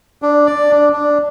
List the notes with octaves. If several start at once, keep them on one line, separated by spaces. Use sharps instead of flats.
D4
D5
D4
D4